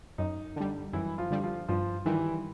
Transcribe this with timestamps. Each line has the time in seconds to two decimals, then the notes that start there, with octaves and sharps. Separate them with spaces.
0.18 F#2 D#4
0.56 D3 G3
0.93 F#2 E3 E4
1.18 F3 F4
1.31 D3 G3
1.43 F3 F4
1.68 G2 F3 F4
2.06 D#3 E3 G3 E4